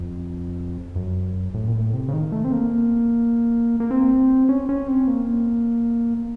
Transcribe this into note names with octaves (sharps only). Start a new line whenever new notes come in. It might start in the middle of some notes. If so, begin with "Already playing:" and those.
Already playing: F2
F#2
A2
A#2
A2
C3
C#3
D#3
A3
C4
A#3
A#3
C4
C#4
C#4
C4
A#3